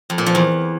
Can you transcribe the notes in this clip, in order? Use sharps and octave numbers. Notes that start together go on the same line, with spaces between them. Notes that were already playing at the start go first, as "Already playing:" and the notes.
F2
A#2
F3
E2